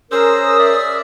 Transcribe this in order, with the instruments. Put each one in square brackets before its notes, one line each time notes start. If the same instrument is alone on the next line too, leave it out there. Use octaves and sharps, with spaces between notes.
[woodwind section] C#4 A#4 [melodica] G#4 C5 E6 [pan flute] D#6
[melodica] D5 E5